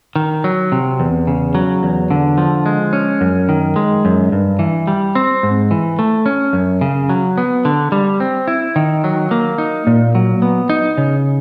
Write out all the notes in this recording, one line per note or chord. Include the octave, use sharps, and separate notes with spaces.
D#3
F#3
C3
E2
C#3
F#3
E2
D3
F3
G#3
C#4
F#2
D#3
G#3
F#2
G2
E3
G3
C4
G#2
E3
A3
C#4
F#2
C#3
F#3
B3
D3
G3
C4
E4
D#3
F#3
A#3
D#4
A#2
F#3
B3
D#4
C#3